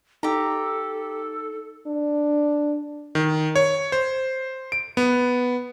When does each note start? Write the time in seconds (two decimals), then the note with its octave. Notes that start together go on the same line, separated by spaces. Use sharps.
0.23 D#4 G4 A4 A#5
1.87 D4
3.15 D#3
3.56 C#5
3.92 C5
4.72 D7
4.97 B3